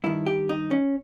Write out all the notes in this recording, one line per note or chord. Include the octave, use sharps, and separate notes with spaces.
G2 D#3 E4
G4
D#4
C#4